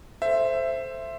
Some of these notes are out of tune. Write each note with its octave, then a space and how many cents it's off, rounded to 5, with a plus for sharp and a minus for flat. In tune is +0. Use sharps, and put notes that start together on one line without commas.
A4 +0 C5 +0 E5 +15